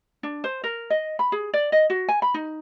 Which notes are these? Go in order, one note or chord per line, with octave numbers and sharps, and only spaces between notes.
D4
C5
A#4
D#5
B5
G#4
D5
D#5
F#4
G#5
B5
D#4